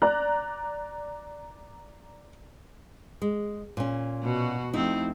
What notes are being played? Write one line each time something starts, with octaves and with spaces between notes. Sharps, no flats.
D5 A#5 F#6
G#3
A#2 C#4
B2 F#4
F2 A3 C4 D#4 E4